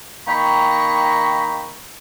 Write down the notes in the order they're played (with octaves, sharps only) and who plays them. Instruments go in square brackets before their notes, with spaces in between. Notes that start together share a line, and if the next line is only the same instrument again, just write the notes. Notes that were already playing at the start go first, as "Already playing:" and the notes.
[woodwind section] D#3 A#3 G5 A#5 B5 C#6